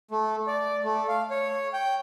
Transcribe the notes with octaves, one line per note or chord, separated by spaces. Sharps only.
A3
D5
A3
F5
C#5
G5